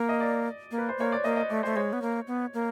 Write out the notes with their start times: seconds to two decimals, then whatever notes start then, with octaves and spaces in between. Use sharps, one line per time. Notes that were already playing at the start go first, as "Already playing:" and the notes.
Already playing: A#3
0.09 D#5
0.20 D5
0.71 A#3
0.78 B4
0.89 C5
0.98 A#3 C#5
1.12 D5
1.24 A#3 D#5
1.36 D#5
1.50 A3 D5
1.63 A3 C5
1.76 G#3 C#5
1.93 B3
2.02 A#3
2.27 B3
2.54 A#3